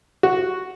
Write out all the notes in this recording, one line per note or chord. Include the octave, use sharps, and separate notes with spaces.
F#4